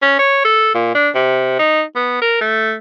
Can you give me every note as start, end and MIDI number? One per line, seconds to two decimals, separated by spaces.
0.02 0.16 61
0.19 0.43 73
0.45 0.72 69
0.75 0.93 46
0.95 1.09 62
1.15 1.55 48
1.59 1.83 63
1.96 2.17 59
2.22 2.41 70
2.41 2.76 57